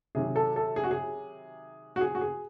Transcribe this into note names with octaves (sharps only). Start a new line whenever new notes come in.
C3 D#3 F#3 G#4
A4
A4
G#4
F#4
G#4
F#4
G#4
F#4
G#4